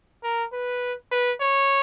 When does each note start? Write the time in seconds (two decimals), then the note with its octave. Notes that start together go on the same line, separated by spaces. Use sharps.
0.24 A#4
0.53 B4
1.12 B4
1.41 C#5